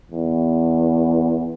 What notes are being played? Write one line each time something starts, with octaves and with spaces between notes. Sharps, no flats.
E2